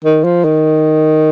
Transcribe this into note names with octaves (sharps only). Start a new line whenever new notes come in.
D#3
F3
D#3